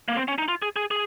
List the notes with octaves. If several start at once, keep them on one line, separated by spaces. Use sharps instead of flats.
A#3
C4
C#4
D#4
F4
G#4
G#4
G#4